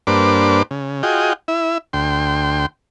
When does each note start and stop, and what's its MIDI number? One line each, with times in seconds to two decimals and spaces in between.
0.07 0.63 43
0.07 0.63 58
0.07 0.63 62
0.07 0.63 71
0.07 0.63 72
0.07 0.63 86
0.71 1.03 49
1.03 1.33 65
1.03 1.33 66
1.03 1.33 68
1.03 1.33 75
1.03 1.33 79
1.48 1.78 64
1.48 1.78 76
1.93 2.66 38
1.93 2.66 79
1.93 2.66 84